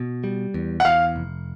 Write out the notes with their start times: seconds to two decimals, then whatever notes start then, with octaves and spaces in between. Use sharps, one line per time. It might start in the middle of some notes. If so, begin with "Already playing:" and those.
Already playing: B2
0.24 G3
0.54 E2
0.80 F#5
0.85 E2 F5
1.16 F1